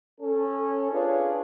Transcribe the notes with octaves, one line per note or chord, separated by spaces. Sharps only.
C#4 A4
D4 F4 G#4 B4 C#5